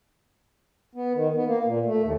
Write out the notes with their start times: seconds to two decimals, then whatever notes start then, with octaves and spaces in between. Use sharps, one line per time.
0.95 B3
1.15 D#3
1.35 B3
1.47 A#3
1.65 A#2
1.86 A3
2.02 D#2